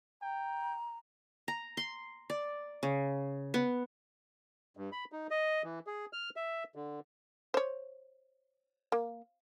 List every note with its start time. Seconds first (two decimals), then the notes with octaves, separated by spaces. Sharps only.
0.22 G5 A#5
1.48 A#5
1.77 C6
2.30 D5
2.83 C#3
3.54 B3
4.77 G2
4.92 B5
5.12 D#4
5.31 D#5
5.64 E3
5.87 G#4
6.13 F6
6.36 E5
6.75 D3
7.54 C5 C#5
8.92 A#3